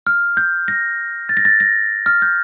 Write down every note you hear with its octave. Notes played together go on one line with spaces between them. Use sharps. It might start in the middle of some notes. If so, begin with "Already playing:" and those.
F6
G6
A#6
A6
A#6
A6
A#6
F6
G6